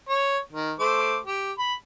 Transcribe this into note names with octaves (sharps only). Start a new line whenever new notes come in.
C#5
D#3
A3 C5 D6
G4
B5